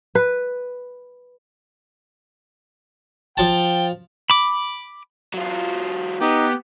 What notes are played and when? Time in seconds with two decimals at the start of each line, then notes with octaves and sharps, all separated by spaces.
0.15 B4
3.37 F3 G5 A5
4.30 B5 D6
5.34 F#3 F4
6.21 B3 D#4 G4